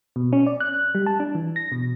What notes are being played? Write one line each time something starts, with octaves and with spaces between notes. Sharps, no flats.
B2
C#4
D5
F#6
G3
A5
D4
E3
A#6
B2